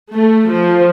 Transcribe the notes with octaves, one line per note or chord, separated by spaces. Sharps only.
A3
F3